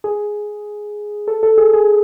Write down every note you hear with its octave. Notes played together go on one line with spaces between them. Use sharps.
G#4
A4
A4
G#4
G#4